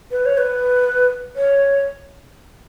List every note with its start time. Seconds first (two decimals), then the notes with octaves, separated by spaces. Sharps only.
0.11 B4
0.26 C#5
0.38 B4
1.36 C#5